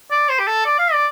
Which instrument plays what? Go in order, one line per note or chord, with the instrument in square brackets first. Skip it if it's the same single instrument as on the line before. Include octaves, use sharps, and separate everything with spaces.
[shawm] D5
C5
G4
A4
D5
F5
D5